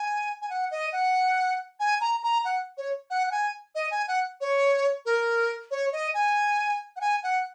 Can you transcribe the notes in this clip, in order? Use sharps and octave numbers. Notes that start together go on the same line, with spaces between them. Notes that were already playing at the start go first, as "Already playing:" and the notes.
Already playing: G#5
G#5
F#5
D#5
F#5
G#5
A#5
A#5
F#5
C#5
F#5
F#5
G#5
D#5
G#5
F#5
C#5
A#4
C#5
D#5
G#5
F#5
G#5
F#5